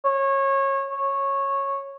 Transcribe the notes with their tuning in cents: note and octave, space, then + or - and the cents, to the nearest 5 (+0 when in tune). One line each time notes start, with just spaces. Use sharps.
C#5 -25
C#5 -10